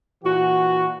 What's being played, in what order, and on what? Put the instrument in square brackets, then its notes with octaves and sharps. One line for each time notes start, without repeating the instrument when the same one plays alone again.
[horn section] A#2 E3 F#4